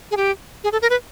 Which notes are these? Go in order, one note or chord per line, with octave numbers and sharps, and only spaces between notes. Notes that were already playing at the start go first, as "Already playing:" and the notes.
G#4
G4
G#4
A4
A#4
B4